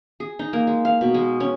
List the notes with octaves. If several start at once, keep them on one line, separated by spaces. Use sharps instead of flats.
G#4
D#4
A#3
G#3
F5
B2
G#3
C#4